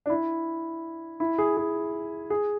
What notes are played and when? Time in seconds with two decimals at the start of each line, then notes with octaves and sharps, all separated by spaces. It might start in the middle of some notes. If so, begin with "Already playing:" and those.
0.06 D4
0.10 E4
1.20 E4
1.38 G#4
1.57 G#4
2.30 G#4